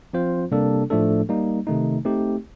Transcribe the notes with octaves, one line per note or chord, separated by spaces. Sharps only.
F3 C4 F4 C5
C3 G3 A#3 D4 A4
A2 F3 A3 D4 A4
G3 A#3 D#4
C3 D#3 A3 D#4
A3 C4 D#4 G4